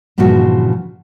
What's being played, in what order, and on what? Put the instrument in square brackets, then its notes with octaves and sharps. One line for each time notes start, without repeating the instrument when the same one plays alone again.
[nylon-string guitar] G2 A#2 C#3 E3 F3 F#4